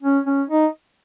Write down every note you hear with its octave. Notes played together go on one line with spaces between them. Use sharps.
C#4
C#4
D#4